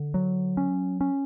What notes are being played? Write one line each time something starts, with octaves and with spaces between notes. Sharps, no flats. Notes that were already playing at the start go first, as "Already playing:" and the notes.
Already playing: D3
F#3
C#4
C#4